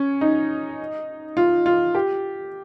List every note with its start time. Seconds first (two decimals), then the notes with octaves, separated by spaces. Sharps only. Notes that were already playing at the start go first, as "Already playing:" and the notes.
Already playing: C#4
0.21 D#4
1.37 F4
1.66 F4
1.95 G4